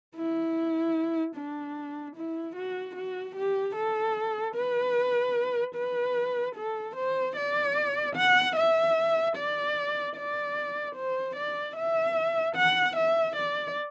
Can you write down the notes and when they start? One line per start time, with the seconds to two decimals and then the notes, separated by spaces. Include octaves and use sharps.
0.16 E4
1.36 D4
2.16 E4
2.56 F#4
2.95 F#4
3.36 G4
3.76 A4
4.56 B4
5.75 B4
6.56 A4
6.96 C5
7.36 D5
8.16 F#5
8.56 E5
9.36 D5
10.16 D5
10.96 C5
11.36 D5
11.76 E5
12.56 F#5
12.96 E5
13.36 D5